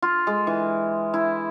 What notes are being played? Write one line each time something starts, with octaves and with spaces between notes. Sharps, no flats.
F4
G#3
E3
E4